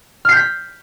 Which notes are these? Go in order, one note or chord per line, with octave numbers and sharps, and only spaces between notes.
F6 G6 B6 C7